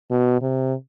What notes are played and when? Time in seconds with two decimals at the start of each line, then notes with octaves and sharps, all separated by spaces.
0.11 B2
0.42 C3